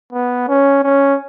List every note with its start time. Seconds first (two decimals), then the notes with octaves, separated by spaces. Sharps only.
0.13 B3
0.48 C#4
0.83 C#4